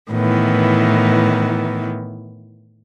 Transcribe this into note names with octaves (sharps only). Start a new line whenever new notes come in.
A2 D#3 E3 B3